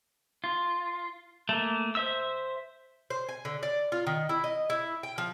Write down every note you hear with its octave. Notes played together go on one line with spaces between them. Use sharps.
F4
A3 A#3
C5 E5 E6
C5
G#5
D3
D5
F4
D#3
E4
D#5
E4
G5
F3